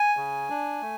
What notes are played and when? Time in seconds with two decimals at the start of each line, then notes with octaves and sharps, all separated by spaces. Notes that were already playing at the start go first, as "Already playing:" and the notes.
Already playing: G#5
0.17 C#3
0.50 D4
0.82 A3